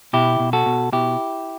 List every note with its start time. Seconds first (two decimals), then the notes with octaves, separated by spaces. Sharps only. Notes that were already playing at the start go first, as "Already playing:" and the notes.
0.13 B2 E4 G4
0.40 B2
0.53 F#4 A4
0.66 B2
0.92 B2 E4 G4